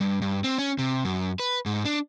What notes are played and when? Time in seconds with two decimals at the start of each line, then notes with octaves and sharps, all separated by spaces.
0.01 G2
0.22 G2
0.44 C4
0.58 C#4
0.78 C3
1.05 F#2
1.39 B4
1.66 G#2
1.85 D4